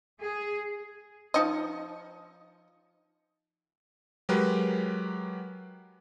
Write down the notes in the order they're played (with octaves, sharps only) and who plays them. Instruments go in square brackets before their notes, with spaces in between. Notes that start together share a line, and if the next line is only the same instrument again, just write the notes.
[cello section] G#4
[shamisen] F3 D#4 D#5
[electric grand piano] F#3 G#3 G4 A#4 B4